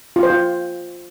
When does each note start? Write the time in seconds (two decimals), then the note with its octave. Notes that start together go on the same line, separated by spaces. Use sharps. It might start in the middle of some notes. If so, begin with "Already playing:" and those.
0.16 F4
0.23 C5
0.30 F4